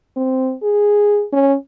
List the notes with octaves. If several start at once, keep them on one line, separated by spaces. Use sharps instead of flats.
C4
G#4
C#4